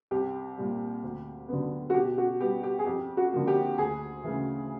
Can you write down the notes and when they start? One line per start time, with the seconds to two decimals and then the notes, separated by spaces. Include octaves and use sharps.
0.11 C2 G4
0.58 A#2 G3
1.03 D2
1.48 D3 F#3 B3
1.90 F#4
1.94 B2 G4
2.18 F#4
2.40 G3 B3 G4
2.63 G4
2.79 G#4
2.86 F2 G4
3.17 F#4
3.32 D3 F3 A#3
3.47 G4
3.78 D2 G#4
4.23 C#3 E3 A3